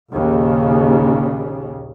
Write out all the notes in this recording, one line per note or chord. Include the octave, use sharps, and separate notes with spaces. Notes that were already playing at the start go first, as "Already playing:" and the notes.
A#1 D#2 C#3